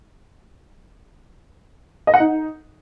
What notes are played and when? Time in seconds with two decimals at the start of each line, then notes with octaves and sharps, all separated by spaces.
2.07 D#5
2.14 F#5
2.20 D#4